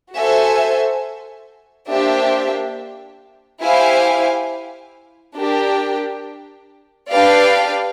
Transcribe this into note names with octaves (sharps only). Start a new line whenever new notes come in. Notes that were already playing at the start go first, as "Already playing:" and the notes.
F#4 A4 C5 E5 G#5
A#3 D4 G4 C5 E5
E4 G4 C5 F5 G#5
D4 G4 A#4
D4 G4 B4 D5 F5